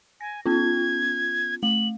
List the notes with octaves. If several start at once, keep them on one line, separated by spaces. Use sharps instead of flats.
G#5 A#6
B3 C#4 F4 G#6
A3 F#7